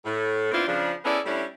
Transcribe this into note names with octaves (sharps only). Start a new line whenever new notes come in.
A2
B3 C4 D4 E4 F4
C#3 F3 D4
B3 C#4 E4 G#4 A4 D5
A2 G3 C#4 D4 E4